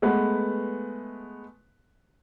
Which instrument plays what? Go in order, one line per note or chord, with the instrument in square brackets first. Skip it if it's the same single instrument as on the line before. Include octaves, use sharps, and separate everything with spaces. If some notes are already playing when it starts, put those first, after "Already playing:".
[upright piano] G#3 A3 B3 B4